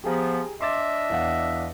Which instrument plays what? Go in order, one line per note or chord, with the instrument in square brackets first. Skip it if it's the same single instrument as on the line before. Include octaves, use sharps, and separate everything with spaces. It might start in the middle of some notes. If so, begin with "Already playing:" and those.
[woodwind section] F3 B3 [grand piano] G4 G#4 A#5
[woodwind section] D4 D#5 E5 [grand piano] C6 D6 A6
[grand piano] E2 F5 F#5